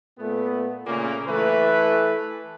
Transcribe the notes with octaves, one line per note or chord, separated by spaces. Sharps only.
A#2 A3 B3
A#2 C#3 A3 A#3
E3 A3 A4 B4